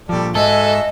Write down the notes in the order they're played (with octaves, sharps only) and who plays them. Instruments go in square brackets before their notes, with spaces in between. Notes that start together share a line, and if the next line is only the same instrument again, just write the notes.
[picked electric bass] A#2 F3 [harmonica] G3 A4 D5
[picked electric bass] G#2 [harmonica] F#4 E5 G#5 [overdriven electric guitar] A4 [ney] D#5